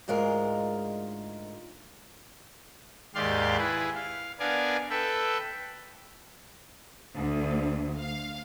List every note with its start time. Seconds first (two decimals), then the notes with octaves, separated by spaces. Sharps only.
0.08 D2 G#2 G#3 F4 A#4
3.15 D#2 G#2 G4 D5 F5 C6
3.57 E4 G#4 B4
3.96 F5
4.39 B3 D4 A#4 D5 F5 G#5
4.90 A4 B4 E5 G5
7.17 D2
7.98 F5